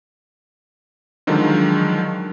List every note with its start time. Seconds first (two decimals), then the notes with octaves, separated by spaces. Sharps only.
1.27 D3 D#3 F3 F#3 G#3 D4